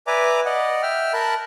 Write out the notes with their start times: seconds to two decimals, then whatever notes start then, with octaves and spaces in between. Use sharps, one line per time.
0.07 B4 D5 E5 G#5 A#5 D6
0.45 D5 D#5 F#5
0.83 E5 G5 F6
1.13 A#4 A5 B5 F#6